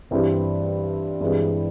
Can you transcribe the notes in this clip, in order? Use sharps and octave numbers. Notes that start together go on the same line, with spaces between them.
G2 E3 G3 C4 E4
G2 E3 G#3 C4